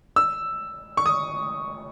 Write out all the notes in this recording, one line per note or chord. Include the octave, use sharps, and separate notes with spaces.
E6
C#6
D#6